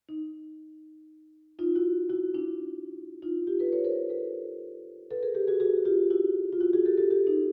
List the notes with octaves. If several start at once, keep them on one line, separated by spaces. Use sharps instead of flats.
D#4
D#4 F4
E4 F#4
E4 F#4
D4 E4
D#4 F4
F4 G4
A4 B4
B4 C#5
A#4 C5
A4 B4
A4 B4
G#4 A#4
G4 A4
F#4 G#4
F#4 G#4
F4 G4
E4 F#4
F4
E4 F#4
F#4 G#4
G4 A4
G4 A4
G4 A4
D#4